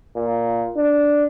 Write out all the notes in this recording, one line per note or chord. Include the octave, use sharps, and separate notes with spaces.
A#2
D4